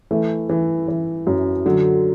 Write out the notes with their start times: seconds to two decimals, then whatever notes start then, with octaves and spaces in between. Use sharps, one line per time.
0.11 E3 A3
0.49 E3
0.88 E3
1.27 F#2
1.65 D3 F#3